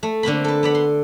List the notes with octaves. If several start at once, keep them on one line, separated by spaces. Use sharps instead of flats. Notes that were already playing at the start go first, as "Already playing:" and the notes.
A3
D3 A#3 C4 B5
A4 B4
B3 D5 B5
C6